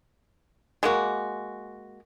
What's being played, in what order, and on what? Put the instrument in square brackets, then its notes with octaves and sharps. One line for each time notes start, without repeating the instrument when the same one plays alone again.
[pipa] G#3 A#3 F#4